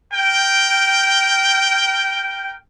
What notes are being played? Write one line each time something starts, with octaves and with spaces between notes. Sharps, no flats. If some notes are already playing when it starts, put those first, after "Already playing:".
A#4 G5